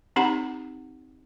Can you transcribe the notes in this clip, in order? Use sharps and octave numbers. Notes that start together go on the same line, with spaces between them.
C4 D#4 G4 F#5 A#5 B5